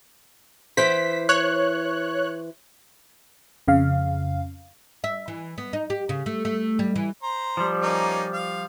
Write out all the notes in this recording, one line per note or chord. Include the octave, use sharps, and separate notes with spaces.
E3 C5 B6
C#5 F#6
F2 C#3 F5
E5
E3
B3
D#4
G4
C#3
A3
A3
G3
E3
C5 A#5
F3 G3
A#3 C#4 D#4
F5